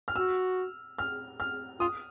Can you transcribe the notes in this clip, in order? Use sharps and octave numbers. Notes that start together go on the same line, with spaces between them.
F6
F#4 E6
F6
F6
F4 D#6